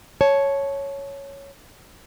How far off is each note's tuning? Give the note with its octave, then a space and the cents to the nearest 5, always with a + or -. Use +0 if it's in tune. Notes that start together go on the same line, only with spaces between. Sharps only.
C#5 +0 A5 -20